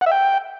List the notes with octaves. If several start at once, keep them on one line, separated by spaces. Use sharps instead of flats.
F#5
E5
G5